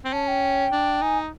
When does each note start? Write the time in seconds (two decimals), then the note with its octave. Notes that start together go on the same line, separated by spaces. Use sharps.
0.05 C4
0.13 C#4 A5
0.28 G5
0.72 D4
1.02 D#4 G#5